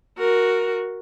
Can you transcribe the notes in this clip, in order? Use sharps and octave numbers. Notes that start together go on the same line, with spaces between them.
F#4 A#4